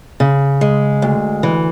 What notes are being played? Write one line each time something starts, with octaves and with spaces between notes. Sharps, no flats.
C#3
G#3
D2
E3